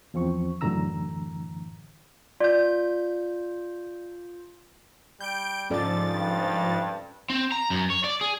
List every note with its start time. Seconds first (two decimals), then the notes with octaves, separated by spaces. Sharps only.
0.14 E2 F3 C4 C#6
0.61 F#2 A2 D3 E3 A#5 E6
2.40 F4 D5 G6
5.21 G3 G6 D7
5.70 G#2 F3 C#4 A4 D5 A6
6.12 G2
7.30 C4
7.52 A#5
7.70 F#2
7.90 C#5
8.04 D5
8.21 G#4